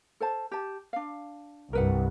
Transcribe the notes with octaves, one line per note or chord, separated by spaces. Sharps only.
A4 C5 A5
G4 A5
D4 F5
C2 G2 A#4 B4 F#5